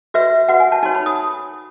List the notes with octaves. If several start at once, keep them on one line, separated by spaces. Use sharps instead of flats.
F#4 B4 E5
F#4 B4 F#5
G#5
A5
D#4 F#4 C#5 A5
B5
D#6